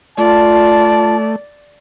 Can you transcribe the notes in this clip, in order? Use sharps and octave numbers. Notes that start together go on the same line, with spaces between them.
A3 F4 D5 A5